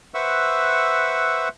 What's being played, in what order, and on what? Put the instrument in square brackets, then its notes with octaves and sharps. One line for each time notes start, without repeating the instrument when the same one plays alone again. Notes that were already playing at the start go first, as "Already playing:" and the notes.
[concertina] B4 C5 E5 F#5 C#6 E6